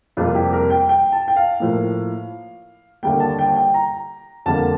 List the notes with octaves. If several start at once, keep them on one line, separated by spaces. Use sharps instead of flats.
F2 C3 G3 A#3 F4
G4
A#4
G5
G5
A5
G5
F5
A2 F3 A#3
D#2 D3 G3 A#3 G5
A5
G5
G5
A#5
F2 D3 G3 A#3 A5